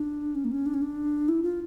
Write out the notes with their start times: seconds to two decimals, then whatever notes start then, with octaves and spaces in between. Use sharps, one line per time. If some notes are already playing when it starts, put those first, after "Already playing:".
Already playing: D4
0.35 C#4
0.45 A#3
0.52 C#4
0.66 D4
0.74 C#4
0.82 D4
1.29 E4
1.43 F4